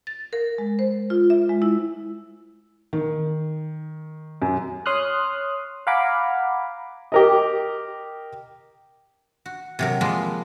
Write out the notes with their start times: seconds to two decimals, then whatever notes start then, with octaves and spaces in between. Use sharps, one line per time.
0.07 A6
0.33 A#4
0.58 G#3
0.79 C5
1.10 F4
1.30 E5
1.49 G#3
1.62 E4
2.93 D#3
4.42 F#2
4.86 C#5 C6 D#6 F6 F#6
5.87 F5 F#5 G#5 A#5 B5 D6
7.12 G4 A#4 D#5
9.46 F#4
9.79 C3 F#3 A#4
10.01 F3 G#3 A#3 F4 A#4 B4